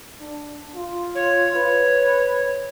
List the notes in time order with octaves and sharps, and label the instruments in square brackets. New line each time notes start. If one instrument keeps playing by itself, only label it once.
[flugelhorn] D4
F4
[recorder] C#5
[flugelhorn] B4